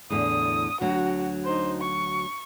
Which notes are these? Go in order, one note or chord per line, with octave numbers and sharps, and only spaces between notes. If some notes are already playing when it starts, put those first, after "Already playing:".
E2 A2 D3 D#6
D2 F#3 F#4
D#4 C5
C#6